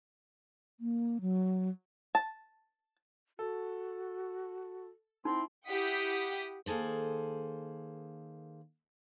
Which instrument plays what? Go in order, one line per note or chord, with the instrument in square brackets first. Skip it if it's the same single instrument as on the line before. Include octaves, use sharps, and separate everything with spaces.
[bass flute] A#3
F#3
[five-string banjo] A5
[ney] F#4 [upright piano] A4
[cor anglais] C4 [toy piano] D#4 [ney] E4
[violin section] E4 G4 F#5 G5 D#6 B6
[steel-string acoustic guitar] D#3 A#3 G#4 A4 C5